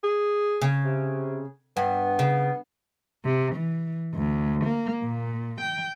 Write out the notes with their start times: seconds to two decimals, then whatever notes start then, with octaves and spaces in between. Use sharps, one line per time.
0.03 G#4
0.62 C#3
0.84 C3
1.77 G2 B3
2.19 C#3
3.25 C3
3.55 E3
4.14 D2
4.65 A#3
5.03 A#2
5.61 G5